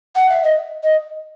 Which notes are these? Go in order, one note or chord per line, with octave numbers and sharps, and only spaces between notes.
F#5
E5
D#5
D#5